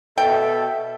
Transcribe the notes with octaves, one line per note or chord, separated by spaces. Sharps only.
B2 A4 E5 G5